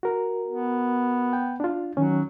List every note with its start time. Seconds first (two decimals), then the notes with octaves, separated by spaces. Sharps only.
0.03 F#4 A#4
0.48 B3
1.33 G5
1.60 D4 F4
1.97 D#3 F#3 C#4